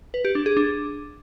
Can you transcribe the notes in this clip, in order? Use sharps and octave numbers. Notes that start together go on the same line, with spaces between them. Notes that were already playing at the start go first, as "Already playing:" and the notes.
B4
G4
D4
G#4
D4